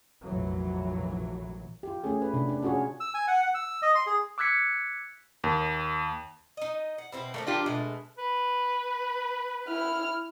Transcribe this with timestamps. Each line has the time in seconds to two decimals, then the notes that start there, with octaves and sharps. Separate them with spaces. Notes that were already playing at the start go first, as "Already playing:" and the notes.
0.23 F1 A#1 E3 F#3
1.83 F4 G4
2.04 A3 C#4 G#4
2.22 B4
2.34 C3 D4
2.49 D4
2.62 C#4 F4 F#4 G#4 C#5
3.00 E6
3.14 G#5
3.28 F#5
3.43 F#5
3.55 E6
3.82 D#5
3.95 C6
4.07 G#4
4.38 D6 E6 F#6 G#6 B6 C#7
5.44 D#2
6.57 D#4 D#5
6.98 F#5
7.12 B2 C4 E4
7.34 F3 G3 A3 A#3
7.47 D4 F4 G4
7.66 B2 G#3 A3
8.18 B4
9.69 E4 F6